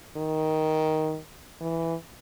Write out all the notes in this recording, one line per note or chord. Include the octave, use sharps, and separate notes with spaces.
D#3
E3